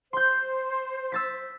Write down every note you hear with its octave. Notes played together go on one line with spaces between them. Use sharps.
C5 C6 G6
E6 A6 B6